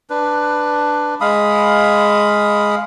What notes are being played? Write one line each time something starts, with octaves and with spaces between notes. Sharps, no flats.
D4 B4
G#3 F5 B5 D#6